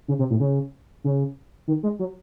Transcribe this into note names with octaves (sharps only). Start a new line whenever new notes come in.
C#3
C3
A2
C#3
C#3
D#3
G#3
F#3